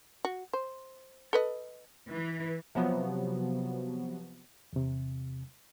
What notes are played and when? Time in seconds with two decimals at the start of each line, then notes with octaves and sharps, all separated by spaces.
0.25 F#4
0.53 C5
1.33 A4 B4 D#5
2.11 E3
2.75 C3 F3 F#3 B3 F#4
4.73 E2 C3